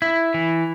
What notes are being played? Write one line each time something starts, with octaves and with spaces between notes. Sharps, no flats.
E4
E3